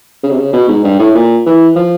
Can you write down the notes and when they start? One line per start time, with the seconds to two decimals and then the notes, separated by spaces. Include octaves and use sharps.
0.23 C#3
0.31 C3
0.37 C#3
0.53 B2
0.68 G#2
0.84 G2
0.99 A2
1.15 A#2
1.46 E3
1.76 F3